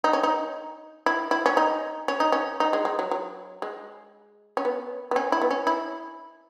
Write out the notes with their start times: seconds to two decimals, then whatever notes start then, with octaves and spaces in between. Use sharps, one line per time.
0.04 D#4
0.13 C#4
0.23 D#4
1.06 E4
1.31 E4
1.46 C#4
1.57 D#4
2.08 C#4
2.20 D#4
2.32 C#4
2.60 D#4
2.73 G#3
2.85 G#3
2.99 F#3
3.11 F#3
3.62 G#3
4.57 C#4
4.65 B3
5.11 B3
5.16 C#4
5.32 E4
5.42 B3
5.51 C#4
5.67 E4